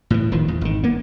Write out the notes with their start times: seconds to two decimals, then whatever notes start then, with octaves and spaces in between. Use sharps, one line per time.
0.10 A2 E3
0.31 D#1 D#3 F3
0.48 E2
0.61 G#1 D#3
0.83 A#3 B3